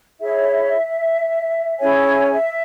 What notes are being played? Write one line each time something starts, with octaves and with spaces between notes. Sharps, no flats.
E4 G#4 C#5 E5
C#4 E4 G#4 C#5 G#5
G#5
E5